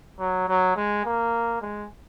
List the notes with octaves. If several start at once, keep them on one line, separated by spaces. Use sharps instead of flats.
F#3
F#3
G#3
A#3
G#3